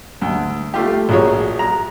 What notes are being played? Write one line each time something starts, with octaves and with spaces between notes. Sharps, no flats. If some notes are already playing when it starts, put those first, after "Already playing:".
D2
A3 F4 G4
A#1 F#4 G#4 C#5
A#5